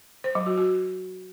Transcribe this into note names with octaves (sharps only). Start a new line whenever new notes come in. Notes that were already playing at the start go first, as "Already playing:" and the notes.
C5
F#3
F#4
F#4